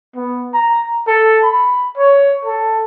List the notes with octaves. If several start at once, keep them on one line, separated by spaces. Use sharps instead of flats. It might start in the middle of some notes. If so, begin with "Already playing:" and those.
B3
A#5
A4
B5
C#5
A4